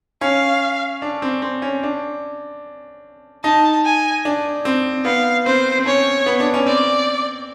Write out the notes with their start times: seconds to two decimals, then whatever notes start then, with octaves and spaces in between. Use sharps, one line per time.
0.21 C#4 F5
1.02 D4
1.22 C4
1.42 C4
1.62 C#4
1.83 D4
3.44 D#4 A5
3.85 G#5
4.25 D4
4.65 C4
5.05 B3 F5
5.46 C4 C5
5.78 C4
5.86 C#4 C#5
6.26 B3
6.40 D4
6.54 C#4
6.66 C4 D5